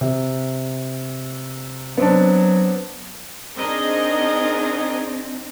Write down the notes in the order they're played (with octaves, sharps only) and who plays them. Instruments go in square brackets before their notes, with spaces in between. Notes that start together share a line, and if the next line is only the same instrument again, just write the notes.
[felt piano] C3
[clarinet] F#3 [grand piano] B3 C4 D4
[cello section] C4 D4 D#4 [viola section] G#4 A#4 D#5